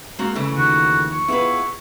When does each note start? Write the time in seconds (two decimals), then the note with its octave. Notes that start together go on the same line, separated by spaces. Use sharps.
0.19 G#3 A#3 C4 F#4
0.35 C#3 E3 A3
0.56 D#2 D#3 F3 F#4
1.11 C#6
1.28 B3 E4 F4 G#4 B4